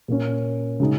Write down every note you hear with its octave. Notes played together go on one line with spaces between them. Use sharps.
A#2 A#3 C#4
C#3 G#3 D#4